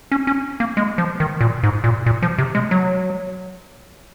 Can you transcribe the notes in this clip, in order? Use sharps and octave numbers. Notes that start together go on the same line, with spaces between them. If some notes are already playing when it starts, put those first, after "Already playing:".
C#4
C#4
A#3
G#3
F3
D#3
A#2
G#2
A#2
A#2
F3
C3
G#3
F#3